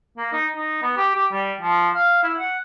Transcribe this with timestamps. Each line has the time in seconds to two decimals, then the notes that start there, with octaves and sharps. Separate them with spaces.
0.17 A#3
0.33 D#4
0.56 D#4
0.83 B3
0.97 G4
1.15 G4
1.32 G3
1.61 F3
1.95 F5
2.23 E4
2.39 F#5